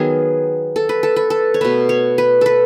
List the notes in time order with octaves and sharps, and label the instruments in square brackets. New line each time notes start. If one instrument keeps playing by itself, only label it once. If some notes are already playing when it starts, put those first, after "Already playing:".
Already playing: [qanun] D#3 F#3 B3 G#4
A4
B4
A4
B4
A4
C#5
B2 A3 B4
C#5
B4
A4 B4